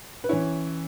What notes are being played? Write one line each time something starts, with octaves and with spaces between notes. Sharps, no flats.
B4
E3 C#4 E4 C#5